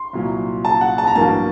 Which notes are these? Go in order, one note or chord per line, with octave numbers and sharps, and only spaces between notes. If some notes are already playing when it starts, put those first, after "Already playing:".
Already playing: C6
C2 A#2 F#3
A5
F#5
A5
A#5
A1 G2 F#3 A#3 A5